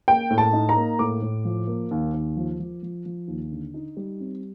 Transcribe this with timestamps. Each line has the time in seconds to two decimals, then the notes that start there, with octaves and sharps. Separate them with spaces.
0.08 A#3 G5
0.30 A2
0.38 A5
0.53 D#4
0.69 A#5
0.76 A#3
0.99 A2 D6
1.22 A2
1.45 F3
1.67 A#3
1.91 D#2
2.14 D#2
2.37 F3
2.60 F3
2.83 F3
3.06 F3
3.28 D#2
3.52 D3
3.74 D#4
3.97 G3
4.20 C4